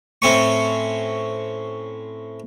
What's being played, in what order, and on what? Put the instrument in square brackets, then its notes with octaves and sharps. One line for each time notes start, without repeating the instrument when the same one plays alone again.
[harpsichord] A2 C4 C#4 C#6